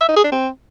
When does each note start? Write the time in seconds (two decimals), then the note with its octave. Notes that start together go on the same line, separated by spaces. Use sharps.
0.01 E5
0.09 D#4
0.16 G#4
0.24 D4
0.32 C4